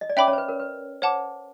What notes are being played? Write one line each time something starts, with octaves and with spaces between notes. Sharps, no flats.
D#5
D5
C#4 C#5 E5 G5 B5 D6
C#4 C#5
C5
B4
A#4
B4
C5 C#5 F#5 A5 D6